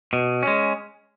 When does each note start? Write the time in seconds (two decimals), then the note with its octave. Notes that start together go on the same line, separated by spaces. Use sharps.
0.13 B2
0.43 G#3 C#4